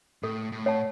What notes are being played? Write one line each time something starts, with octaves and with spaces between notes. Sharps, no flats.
A2 A4
A2
C#5 F#5 A5